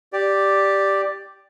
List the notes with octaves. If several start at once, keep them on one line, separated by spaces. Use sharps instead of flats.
G4 D5